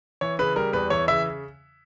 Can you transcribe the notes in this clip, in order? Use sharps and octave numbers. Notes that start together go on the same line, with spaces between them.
E3 C#5
C#3 B4
G3 A#4
E2 B4
E3 C#5
C#3 E5